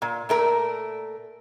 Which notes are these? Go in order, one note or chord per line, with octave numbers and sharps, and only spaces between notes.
A#2
A#2 A3 A#4